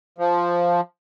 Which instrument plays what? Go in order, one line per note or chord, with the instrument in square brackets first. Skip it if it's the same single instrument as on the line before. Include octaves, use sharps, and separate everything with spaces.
[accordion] F3